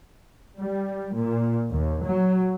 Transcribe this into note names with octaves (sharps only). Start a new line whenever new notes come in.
G3
A#2
D#2
F#3